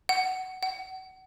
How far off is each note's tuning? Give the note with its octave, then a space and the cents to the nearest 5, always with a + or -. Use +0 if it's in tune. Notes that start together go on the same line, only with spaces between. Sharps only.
F#5 +15
F#5 +30